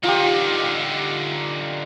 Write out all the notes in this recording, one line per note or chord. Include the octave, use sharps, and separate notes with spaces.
D3 D#4 F4 G4